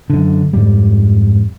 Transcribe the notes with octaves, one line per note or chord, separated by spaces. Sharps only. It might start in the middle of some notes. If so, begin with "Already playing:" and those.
F#2 D3
F2 G#2 G3